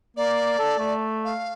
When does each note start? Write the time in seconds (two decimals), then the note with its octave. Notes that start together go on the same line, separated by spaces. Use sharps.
0.16 A#3 D5
0.59 A4
0.79 A3
1.24 F5